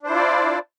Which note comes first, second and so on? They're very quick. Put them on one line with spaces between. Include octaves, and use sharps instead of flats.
D4 C5 E4 F4 D5